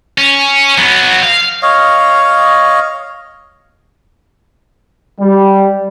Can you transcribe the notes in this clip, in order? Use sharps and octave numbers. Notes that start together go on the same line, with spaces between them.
C#4
F#3 B3
F5
C#5 D#5 F5
G3